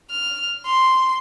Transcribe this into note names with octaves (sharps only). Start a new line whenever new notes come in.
F6
C6